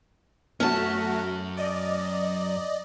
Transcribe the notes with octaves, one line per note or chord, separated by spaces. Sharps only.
F#2 F#3 A3 C#4 F#4 A5
D5 D#5